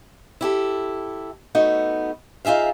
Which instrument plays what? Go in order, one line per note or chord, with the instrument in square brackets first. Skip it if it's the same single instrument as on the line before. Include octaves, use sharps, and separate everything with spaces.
[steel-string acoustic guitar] E4 G4 A4
A3 B3 D#4 F#4
D#4 F4 G#4 E5 F5